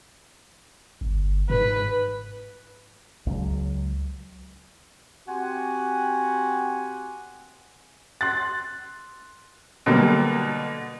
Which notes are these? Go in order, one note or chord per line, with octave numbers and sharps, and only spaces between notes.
G1
G#2 B4
C#2 F#3
C4 F#4 G4 F#5 G#5
C6 F#6 A6
B2 D3 F#3 G3 A#3